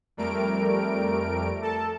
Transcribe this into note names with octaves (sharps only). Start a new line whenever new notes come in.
F2 G3 A3 A#4 D7
A4 A5